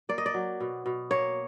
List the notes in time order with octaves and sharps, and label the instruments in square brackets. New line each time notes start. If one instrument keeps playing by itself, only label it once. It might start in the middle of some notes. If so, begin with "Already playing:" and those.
[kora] A#3 D5
D#5
D5
F#3
B2
B2
A#3 C#5